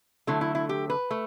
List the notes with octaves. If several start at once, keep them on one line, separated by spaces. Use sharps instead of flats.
D3 F#3 A3 E4
E4
E4
G4
B4
A3